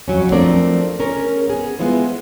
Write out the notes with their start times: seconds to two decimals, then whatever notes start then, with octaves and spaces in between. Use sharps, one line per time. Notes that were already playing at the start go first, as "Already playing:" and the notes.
0.08 F2 F#3 C#4
0.32 F3 A3 C4 D4 A#4 D5
0.99 C#4 G#4 A#4
1.48 B3 G#4
1.79 G#3 B3 E4 F4 C5